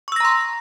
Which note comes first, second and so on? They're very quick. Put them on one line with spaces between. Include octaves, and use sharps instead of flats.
C#6 E6 A#6 A#5 C6